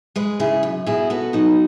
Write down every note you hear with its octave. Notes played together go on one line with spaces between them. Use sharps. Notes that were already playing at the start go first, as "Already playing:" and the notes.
G#3 G#4 B4
C#3 E4 G#4
F#2
B2 E4 G#4
B3 F#4 A4
F#3 D#4 F#4